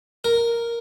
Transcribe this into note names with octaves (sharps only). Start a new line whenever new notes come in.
A#4